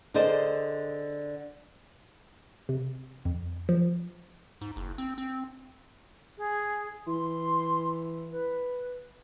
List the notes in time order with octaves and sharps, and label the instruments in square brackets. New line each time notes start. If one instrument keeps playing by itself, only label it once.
[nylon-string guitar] D3 G#4 A#4 C5 D5 D#5
[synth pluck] C3
F2
F3
[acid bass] G#2
F#1
C4
C4
[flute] G#4
[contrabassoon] E3 [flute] C6
[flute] B4